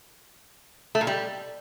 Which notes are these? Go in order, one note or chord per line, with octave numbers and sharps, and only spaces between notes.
A3
A#2
G3